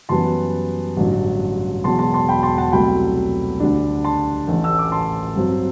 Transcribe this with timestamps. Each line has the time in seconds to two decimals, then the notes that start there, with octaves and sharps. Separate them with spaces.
0.09 F#2 E3 G3 B3 A5 C6
0.96 A1 G2 D3 F#3
1.84 E1 E2 B2 F#3 A5 C6
1.99 A5 C6
2.14 A5 C6
2.29 G5 B5
2.43 A5 C6
2.58 F#5 A5
2.72 C2 B2 F#3 A3 G5 B5
3.60 D2 D3 G3 D4
4.04 A5 C6
4.48 A1 A2 E3 A3
4.64 E6
4.79 D6
4.92 A5 C6
5.36 G2 F#3 C4